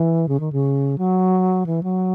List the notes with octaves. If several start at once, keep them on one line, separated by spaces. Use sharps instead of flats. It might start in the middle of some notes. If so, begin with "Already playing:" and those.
Already playing: E3
C#3
D#3
C#3
F#3
E3
F#3